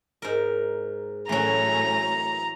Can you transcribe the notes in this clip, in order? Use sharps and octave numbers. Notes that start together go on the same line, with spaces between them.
G#2 A#4
A2 E3 F#3 A3 C#4 A#5